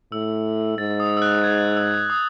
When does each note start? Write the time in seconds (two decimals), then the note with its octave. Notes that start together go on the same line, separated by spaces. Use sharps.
0.12 A2 E6
0.78 G#2 A6
1.00 D#6
1.17 E6
1.22 F#6
1.44 G#6
1.77 E6
2.10 D#6